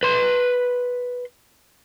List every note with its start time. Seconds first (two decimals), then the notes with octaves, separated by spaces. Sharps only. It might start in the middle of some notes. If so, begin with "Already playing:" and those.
0.03 B4 C6